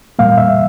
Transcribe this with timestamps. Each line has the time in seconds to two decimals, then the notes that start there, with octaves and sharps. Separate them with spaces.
0.19 A#2 G3 A#3 F5
0.38 E5